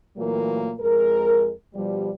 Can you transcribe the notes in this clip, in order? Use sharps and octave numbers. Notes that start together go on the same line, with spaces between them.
A#2 E3 F#3 A3 A#3
F2 G#3 A#4
B2 F3 G3